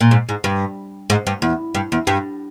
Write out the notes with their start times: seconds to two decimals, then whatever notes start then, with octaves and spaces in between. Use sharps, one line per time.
0.01 A#2
0.11 G#2
0.29 G#2
0.44 G2
1.10 G#2
1.27 G2
1.42 E2
1.75 G2
1.92 E2
2.07 G2